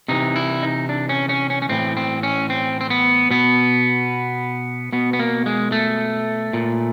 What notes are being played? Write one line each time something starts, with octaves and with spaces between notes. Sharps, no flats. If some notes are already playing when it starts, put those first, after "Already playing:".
C3 E3 D#4
E4
D#4
D4
C#4
C#4
C#4
C#4
A2 E3 C4
C4
C#4
C4
C4
B3
B2 B3
B2 B3
B3
A#3
G#3
A3
A#2